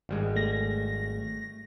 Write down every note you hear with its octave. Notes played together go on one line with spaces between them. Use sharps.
G#1 G3 G#3
A3 A#6